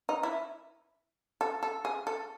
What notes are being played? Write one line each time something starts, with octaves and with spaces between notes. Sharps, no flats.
D#4
E4
A4
A4
G#4
A4